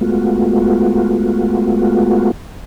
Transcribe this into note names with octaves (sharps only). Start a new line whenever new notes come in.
G#3 A3 B3 F4 F#4